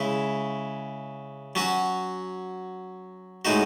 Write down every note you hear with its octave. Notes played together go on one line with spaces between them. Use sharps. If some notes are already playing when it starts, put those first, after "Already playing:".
Already playing: C#3 G#3 C#4 E4
F#3 C#4 F#4
A2 G#3 D#4 F#4